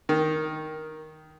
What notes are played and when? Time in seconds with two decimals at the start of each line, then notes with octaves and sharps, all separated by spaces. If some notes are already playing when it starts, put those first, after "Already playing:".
0.09 D#3